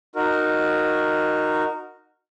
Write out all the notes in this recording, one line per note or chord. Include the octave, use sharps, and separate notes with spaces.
D#4 F#4 A#4